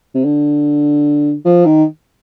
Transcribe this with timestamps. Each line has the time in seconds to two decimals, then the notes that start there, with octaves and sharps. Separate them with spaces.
0.15 C3
0.25 D3
1.46 F3
1.66 D#3